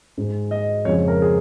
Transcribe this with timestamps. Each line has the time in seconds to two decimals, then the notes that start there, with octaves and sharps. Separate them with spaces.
0.17 G#2 G#3
0.51 D#5
0.85 F2 C#3 F3 G#3 C#5
1.08 A#4
1.22 G#4